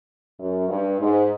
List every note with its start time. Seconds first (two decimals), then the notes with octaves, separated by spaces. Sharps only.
0.40 F#2
0.69 G2
1.00 G#2